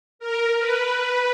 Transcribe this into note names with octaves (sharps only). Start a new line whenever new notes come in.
A#4
B4